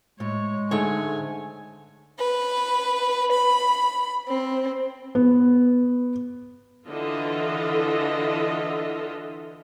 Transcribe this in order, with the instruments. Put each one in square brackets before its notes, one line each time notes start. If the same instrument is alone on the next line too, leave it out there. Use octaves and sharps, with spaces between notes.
[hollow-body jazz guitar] A2 [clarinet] G#3 [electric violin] C#5
[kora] G#2 A3 C#5 [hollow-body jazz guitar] D3 [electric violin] G#5
[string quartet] B4
B5
C4
[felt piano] B3
[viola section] D3 E3 F4 A4 D#5 E5